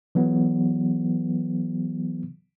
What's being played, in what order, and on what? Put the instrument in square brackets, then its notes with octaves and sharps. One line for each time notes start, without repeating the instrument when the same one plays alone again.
[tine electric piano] E3 F#3 B3